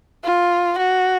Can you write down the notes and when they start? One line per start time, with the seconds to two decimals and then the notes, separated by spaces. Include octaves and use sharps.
0.24 F4
0.78 F#4